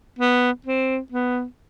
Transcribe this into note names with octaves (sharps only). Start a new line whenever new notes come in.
B3
C4
B3